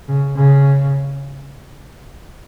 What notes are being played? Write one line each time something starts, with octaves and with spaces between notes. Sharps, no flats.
C#3
C#3